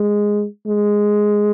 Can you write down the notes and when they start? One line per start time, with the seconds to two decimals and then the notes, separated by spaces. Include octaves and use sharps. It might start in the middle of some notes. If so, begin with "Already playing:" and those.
Already playing: G#3
0.67 G#3